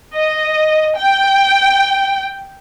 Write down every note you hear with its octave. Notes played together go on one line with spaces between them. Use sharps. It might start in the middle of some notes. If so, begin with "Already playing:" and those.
D#5
G5